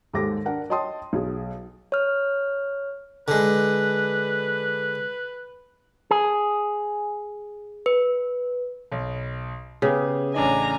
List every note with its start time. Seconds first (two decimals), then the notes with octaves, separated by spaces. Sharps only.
0.14 D#2 G#2 G4 A4 D6 A#6
0.45 D4 A#4 F#5
0.70 C#5 D#5 G5 A5 C6 D#6
1.13 B1 G#4
1.92 C#5 F6
3.28 D3 G#3 B4
6.11 G#4
7.86 B4
8.92 B1
9.82 C#3 B3 G4 G#4
10.34 A1 D4 D#5 G#5 A#5